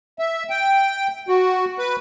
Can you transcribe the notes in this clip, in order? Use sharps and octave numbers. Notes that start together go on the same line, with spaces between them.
E5
G5
F#4
B4